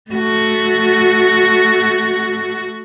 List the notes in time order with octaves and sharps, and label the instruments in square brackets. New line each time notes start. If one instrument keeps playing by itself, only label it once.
[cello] A3 F#4